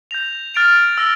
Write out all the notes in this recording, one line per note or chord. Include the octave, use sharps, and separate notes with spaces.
G6 A#6 F7
F6 A6 D7 F7
E6 A#6 D7 G7